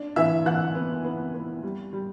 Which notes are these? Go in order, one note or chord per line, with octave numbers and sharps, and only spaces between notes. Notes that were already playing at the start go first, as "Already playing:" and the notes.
Already playing: D4
E3 E5 E6
E3 F#5 F#6
B3
B3
B3
G3
G3